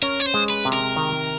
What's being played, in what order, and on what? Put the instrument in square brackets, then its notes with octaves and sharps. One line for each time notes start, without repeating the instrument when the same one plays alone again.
[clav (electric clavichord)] C#4 [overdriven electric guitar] A#4
[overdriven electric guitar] C#5
C5
[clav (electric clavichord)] G#3
[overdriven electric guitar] B4
[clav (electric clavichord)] C3
[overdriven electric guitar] A#4
[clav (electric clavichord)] D#3